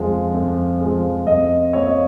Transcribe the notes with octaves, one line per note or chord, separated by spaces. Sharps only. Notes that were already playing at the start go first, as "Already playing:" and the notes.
Already playing: F2 F3 G#3
F2
F3 G#3
F2 D#5
F3 A#3 C#5
D#5